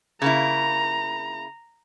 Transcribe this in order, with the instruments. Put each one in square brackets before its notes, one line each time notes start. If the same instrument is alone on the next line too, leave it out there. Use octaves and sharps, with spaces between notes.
[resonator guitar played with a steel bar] C#3 A#3 E4 [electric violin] A#5